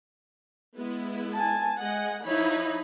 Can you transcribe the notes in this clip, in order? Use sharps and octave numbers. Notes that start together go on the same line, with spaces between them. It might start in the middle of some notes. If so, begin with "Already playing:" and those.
G#3 B3 E4
G#5 A5
G#3 D#5 F#5 G#5
F3 D#4 E4 C#5 B5